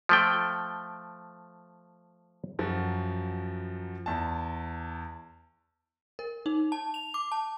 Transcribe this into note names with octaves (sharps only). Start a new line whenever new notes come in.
F3 A3 G5
F#2 F3 F#3
E2 A5
A#4
D#4
A5
F7
D6
A5